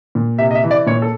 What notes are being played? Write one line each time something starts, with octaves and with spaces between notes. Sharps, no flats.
A#2
C3 E5
D#5
E5
E3
D5
A#2 C#5
A4